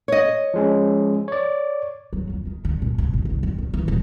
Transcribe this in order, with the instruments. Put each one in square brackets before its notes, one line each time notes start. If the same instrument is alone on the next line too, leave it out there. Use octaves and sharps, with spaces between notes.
[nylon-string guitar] C#5 D#5
[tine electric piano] F3 G#3 C#4
C#5 D5
[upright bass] F#3
F2
D#3
D3
A#2
C3
F#1
C2
F2
A#2
E3
D#1